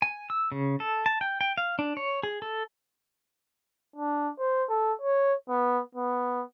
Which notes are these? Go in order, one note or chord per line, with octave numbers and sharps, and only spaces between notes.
G#5
E6
C#3
A4
A5
G5
G5
F5
D4
C#5
G#4
A4
D4
C5
A4
C#5
B3
B3